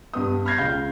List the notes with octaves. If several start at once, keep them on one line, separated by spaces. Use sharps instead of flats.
G2 B3 D#6
B5 F6 G6 G#6 A#6 C7
C#2 C#3 F5 G6